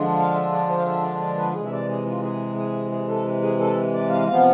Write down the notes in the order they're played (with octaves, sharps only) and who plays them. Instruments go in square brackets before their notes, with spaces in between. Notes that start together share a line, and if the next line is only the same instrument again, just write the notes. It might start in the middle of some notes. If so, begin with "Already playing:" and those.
Already playing: [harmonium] D3 F3 G#3 D4 F4
F5
E5
D5
C5
F5
E5
D5
D5
B4
C3 E3 G#3 G#4
E5
D5
G#4
F4
G#4
G#4
G#4
A4
G#4
A4
D5
F5
C3 F3 B3 F5